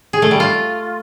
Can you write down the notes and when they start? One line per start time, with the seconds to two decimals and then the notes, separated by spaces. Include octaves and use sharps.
0.13 G#4
0.22 A3
0.31 G3
0.40 F4